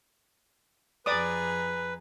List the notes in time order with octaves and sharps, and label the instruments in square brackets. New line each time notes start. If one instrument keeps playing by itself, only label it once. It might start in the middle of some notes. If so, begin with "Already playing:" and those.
[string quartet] F2 G#4 A#5 [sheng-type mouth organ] B4 [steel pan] D5 D6 D#6